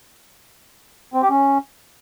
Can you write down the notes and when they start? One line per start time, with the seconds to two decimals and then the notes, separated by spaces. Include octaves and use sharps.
1.14 C4
1.22 G4
1.30 C#4